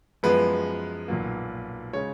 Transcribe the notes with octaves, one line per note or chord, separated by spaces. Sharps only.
F#2 F3 G#3 B3 B4
B1 A#2 F#3 A#3
C#3 G#3 C#5